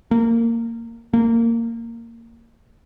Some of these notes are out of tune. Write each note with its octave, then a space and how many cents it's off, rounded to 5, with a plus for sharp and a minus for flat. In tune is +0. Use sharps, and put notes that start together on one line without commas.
A#3 -15
A#3 -15